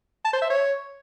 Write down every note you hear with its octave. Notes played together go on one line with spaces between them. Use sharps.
A5
C5
E5
C#5